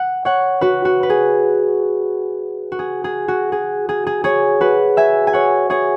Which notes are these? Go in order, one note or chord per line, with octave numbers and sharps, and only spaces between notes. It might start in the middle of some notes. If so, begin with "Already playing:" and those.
Already playing: F#5
C#5 F#5
F#4 B4
F#4
B4
G#4
F#4
G#4
G#4
F#4
G#4
G#4
G#4
G#4 C#5
F#4 B4
E5 G#5
G#5
C#5 F#5
G#4 C#5